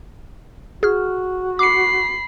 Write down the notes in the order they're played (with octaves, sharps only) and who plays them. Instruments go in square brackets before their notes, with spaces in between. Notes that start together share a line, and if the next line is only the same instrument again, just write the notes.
[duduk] F#4 [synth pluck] G#4 F6
[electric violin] B5 C7 [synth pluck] D6 C#7